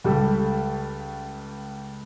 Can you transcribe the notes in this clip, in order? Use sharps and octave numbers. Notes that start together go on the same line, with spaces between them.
C#2 G3 G4 A4